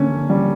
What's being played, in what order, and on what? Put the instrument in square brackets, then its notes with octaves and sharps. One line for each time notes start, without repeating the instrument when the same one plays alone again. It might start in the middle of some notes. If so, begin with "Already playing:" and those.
Already playing: [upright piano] D3 A#3 C#4
G3